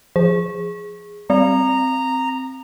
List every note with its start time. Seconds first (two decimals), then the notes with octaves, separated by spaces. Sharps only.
0.16 F3 G#4
1.30 G3 C4 A#5